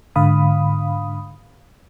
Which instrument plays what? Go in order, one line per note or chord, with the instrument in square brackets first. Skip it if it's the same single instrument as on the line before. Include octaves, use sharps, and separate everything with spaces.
[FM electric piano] G#2 D3 F5 B5 D#6